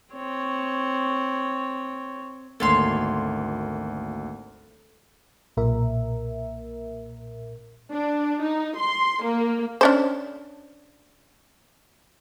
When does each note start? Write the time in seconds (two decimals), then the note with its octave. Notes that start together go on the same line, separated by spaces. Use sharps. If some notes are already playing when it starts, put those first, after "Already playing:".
0.13 C4 C#5
2.60 G#1 D2 A#3 A4 C#5 C6
5.57 B1 A#2 A#4 E5
7.92 D4
8.42 D#4
8.77 C6
9.23 A#3
9.81 C#4 D4 C5